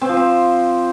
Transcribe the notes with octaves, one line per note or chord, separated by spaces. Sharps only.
C4
F3
C4